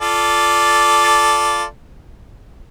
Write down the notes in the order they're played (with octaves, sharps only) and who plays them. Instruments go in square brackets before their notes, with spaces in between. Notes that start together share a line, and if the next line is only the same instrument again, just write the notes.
[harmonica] F4 A4 D5